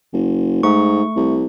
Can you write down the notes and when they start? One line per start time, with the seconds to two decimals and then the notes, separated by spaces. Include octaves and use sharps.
0.13 F#1
0.63 G#2 A3 C#6
1.16 C2